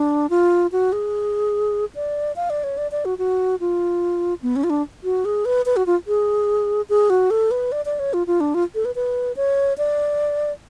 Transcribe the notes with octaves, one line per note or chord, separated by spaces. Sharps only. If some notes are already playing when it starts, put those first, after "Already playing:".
Already playing: D4
F4
F#4
G#4
D5
F5
D5
C#5
D5
D5
F#4
F#4
F4
B3
C#4
F4
D4
F#4
G#4
B4
B4
F#4
F4
G#4
G#4
F#4
A4
B4
D5
D5
C#5
F4
F4
D4
F4
A4
B4
B4
C#5
D5